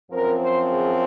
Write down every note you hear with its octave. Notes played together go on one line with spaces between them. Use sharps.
F#2 F3 C4 A#4
C5
G#4